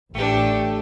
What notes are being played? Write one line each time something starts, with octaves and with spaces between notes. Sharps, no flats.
A1 A3 D4 G4